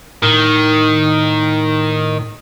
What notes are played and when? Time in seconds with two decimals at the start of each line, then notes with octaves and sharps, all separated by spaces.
0.23 A2 D#3